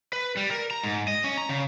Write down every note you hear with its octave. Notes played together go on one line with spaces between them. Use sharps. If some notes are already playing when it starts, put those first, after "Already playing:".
B4
G3
A#4
A#5
G#2
D#5
C#4
A#5
C#3